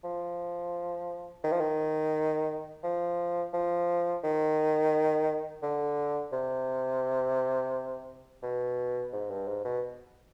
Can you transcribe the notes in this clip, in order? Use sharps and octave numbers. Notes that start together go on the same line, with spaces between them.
F3
D#3
F3
D#3
F3
F3
D#3
D3
C3
B2
G#2
G2
G#2
B2